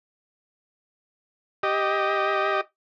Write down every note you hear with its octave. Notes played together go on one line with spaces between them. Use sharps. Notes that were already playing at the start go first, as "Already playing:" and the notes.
G4 D#5